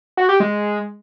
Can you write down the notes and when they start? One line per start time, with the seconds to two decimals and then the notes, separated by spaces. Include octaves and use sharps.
0.17 F#4
0.29 G4
0.40 G#3